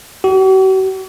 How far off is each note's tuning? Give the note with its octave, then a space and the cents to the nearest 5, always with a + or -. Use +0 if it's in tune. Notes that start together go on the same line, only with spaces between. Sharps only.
F#4 +45